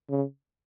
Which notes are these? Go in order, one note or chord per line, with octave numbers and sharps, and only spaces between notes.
C#3